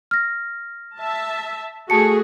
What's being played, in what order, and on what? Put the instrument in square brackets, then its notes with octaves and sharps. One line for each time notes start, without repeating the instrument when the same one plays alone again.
[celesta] F6 A#6
[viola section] E5 A5
[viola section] A3 F#4 G#4 [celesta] A5 C#7